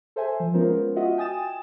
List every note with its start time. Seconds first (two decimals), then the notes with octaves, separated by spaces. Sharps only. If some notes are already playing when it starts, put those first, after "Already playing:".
0.16 A4 C5 E5 G#5
0.40 F3
0.54 G#3 B3 C#4 F4 A#4 C5
0.96 F4 F#4 D#5 E5 F#5
1.18 G5 G#5 D#6 A6 E7